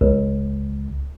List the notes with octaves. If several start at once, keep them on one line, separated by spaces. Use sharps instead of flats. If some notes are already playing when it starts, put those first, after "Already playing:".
C#2